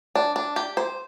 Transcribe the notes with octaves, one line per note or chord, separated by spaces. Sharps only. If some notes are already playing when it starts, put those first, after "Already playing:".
D4
D4
G4
C5